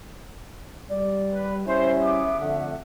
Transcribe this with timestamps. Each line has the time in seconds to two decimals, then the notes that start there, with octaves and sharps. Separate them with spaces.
0.90 G3 D5
1.33 B4
1.67 G3 C#4 E4 C5 E5
2.03 B3 G#4 D6
2.40 F2 D3 A3 F#5